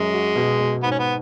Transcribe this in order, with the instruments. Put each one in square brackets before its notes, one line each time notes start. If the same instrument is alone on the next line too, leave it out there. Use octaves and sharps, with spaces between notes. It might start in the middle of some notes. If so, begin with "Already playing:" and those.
Already playing: [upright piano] F#2 C#4 [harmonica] G#3
[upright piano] F#4
B2
B2
[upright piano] G#2 [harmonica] B3
[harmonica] C#4
B3